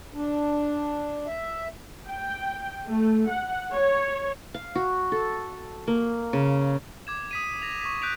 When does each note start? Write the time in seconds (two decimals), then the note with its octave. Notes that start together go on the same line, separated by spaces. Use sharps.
0.14 D4
1.27 E5
2.08 G5
2.89 A3
3.29 F#5
3.73 C#5
4.54 F5
4.75 F#4
5.12 A4
5.87 A#3
6.33 C#3
7.07 D6 G#6 E7
7.31 D#6 B6 D#7
7.62 A#6 F7
7.81 C#6 B6
8.02 F#6 G6 B6 D7 F7